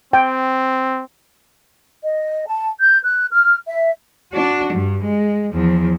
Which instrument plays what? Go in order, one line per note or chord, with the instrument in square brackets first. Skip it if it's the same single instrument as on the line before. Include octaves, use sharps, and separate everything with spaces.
[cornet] C4 [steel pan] G5
[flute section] D#5
A5
G6
F#6
F6
E5
[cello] D4 F#4
G2
G#3
E2 F3